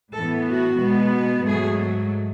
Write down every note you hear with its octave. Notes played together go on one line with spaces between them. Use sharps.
A2 E3 B3 A4
F#4
B2 G#3 B3
G#2 F#3 A3 G#4